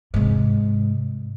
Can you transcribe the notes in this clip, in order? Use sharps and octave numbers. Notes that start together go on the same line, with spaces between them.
G#2 C3